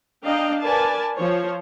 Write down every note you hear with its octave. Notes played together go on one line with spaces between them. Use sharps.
D4 D#5 F5 G5 A#5
A#4 B4 D5 G#5 A5
F3 C5 C#5